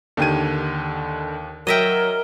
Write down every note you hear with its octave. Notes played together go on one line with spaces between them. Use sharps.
D#2 D3 D#3 G4 G#6 D#7
F#3 A#4 D#5 E5 G5